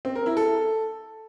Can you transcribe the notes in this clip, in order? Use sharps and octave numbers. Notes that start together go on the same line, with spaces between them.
C4
A#4
E4
A4